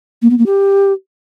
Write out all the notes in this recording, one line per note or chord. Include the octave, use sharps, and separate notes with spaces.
A#3
B3
A#3
G4